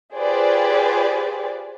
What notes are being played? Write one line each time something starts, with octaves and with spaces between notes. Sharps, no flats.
F4 G4 G#4 B4 C5 D5